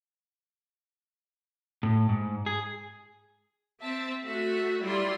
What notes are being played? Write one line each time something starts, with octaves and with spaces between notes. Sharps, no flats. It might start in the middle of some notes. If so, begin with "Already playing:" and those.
A2
G#2
G#4
C4 E5 A5
A3 F#4 E5
F#3 G3 E4 F4 D5 C6